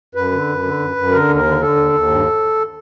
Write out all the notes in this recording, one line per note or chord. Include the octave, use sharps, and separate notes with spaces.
F#2 B4
D3
F#2
D3
F#2
F#2
D3 A#4
D#2
A#4
D3
D3 A4
D#2
D#2
G2